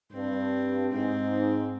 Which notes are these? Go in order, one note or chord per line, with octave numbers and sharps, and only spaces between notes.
G2 C4
G#2 C4